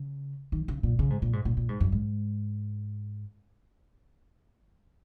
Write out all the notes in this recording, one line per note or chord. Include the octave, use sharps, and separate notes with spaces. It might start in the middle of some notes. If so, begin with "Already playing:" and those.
Already playing: C#3
D#3
C#3
A#2
C#3
G#2
A#2
G#2
A#2
A#2
G#2
F#2
G#2